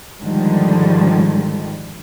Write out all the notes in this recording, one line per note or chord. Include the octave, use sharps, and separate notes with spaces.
G#2 D3 D#3 F3 G3